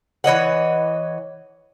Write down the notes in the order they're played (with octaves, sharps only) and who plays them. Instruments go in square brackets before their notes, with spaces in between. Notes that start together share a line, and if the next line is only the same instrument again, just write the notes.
[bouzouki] E3 C#5 D#5 F#5